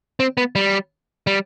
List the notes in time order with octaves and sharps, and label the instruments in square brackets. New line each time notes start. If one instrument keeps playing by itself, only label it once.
[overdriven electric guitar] C4
B3
G3
G3